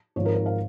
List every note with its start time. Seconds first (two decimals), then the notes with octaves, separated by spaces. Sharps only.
0.16 G#1 G#2 F3 C#5
0.25 A#4
0.36 A#4
0.46 F5